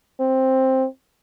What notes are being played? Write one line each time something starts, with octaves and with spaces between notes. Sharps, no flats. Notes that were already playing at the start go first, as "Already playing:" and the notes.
C4